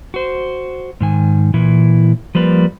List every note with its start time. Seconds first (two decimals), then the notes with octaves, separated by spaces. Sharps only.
0.14 F#4 C5
1.01 G#2 D#3 G#5
1.54 A#2 E3 E4
2.35 F3 G3 A#3 B4